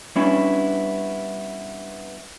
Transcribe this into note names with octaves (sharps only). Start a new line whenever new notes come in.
G3 B3 C#4 D4 E4